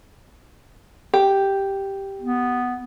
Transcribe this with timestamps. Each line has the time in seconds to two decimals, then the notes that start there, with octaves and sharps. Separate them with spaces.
1.14 G4
2.22 B3